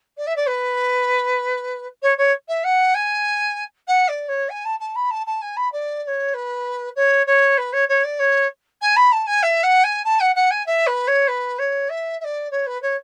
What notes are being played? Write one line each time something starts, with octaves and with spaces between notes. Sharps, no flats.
D5
E5
D5
B4
C#5
C#5
E5
F#5
G#5
F#5
D5
C#5
G#5
A5
A5
B5
A5
A5
G#5
B5
D5
D5
C#5
B4
C#5
C#5
B4
C#5
C#5
D5
C#5
G#5
B5
A5
G#5
E5
F#5
G#5
A5
F#5
F#5
G#5
E5
B4
C#5
B4
C#5
E5
E5
D5
C#5
B4
C#5